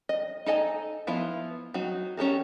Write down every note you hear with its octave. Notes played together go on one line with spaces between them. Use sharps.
D#5
D#4 A4 D#5 G#5
F3 B3 E4 F4
F#3 D#4 F#4
C#4 G4 A4 A#4